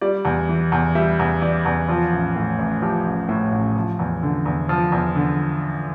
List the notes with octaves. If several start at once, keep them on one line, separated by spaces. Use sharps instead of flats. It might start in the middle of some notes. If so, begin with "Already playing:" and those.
G3 D5
E2
E3
E2
G3 E5
E2
E3 D5
E2
F3 F4
A1
A2
A1
F3 G4
A1
A2
A1
F3
E2
D3
E2
F3
E2
D3